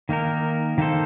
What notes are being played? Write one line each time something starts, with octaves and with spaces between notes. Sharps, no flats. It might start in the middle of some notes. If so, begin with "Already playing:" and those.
D#3 A#3 D#4 A#4
D#3 A#3 D#4 A4 C5